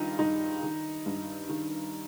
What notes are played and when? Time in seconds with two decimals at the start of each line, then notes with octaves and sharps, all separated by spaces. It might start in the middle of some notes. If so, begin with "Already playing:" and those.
Already playing: G2 D#3 D#4 F4 G4
0.19 G2 D#4
0.62 D#3
1.06 G2
1.49 D#3